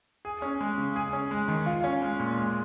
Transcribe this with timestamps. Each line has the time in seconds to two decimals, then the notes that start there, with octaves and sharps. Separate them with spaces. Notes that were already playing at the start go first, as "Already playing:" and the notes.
0.25 G#4
0.42 C#4
0.61 G#3
0.78 C#3
0.96 G#4
1.13 C#4
1.31 G#3
1.48 D#3
1.66 F4
1.84 C#4
2.02 G#3
2.19 A#2
2.38 G#3